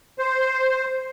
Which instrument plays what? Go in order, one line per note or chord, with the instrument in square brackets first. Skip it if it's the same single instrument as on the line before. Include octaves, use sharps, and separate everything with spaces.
[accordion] C5